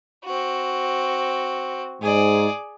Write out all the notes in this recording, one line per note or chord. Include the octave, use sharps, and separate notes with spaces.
C4 F#4
G#2 G#4 D5